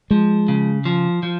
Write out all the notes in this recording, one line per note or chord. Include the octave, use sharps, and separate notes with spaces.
F3 G#3
C#3
F3
F3